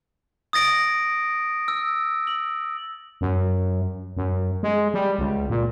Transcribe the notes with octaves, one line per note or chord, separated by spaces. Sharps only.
D#6 A6 A#6 D7
E6
F#7
F#2
F#2
G#3
G3
C#2
A#2